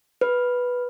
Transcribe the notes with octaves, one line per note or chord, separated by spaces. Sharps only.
B4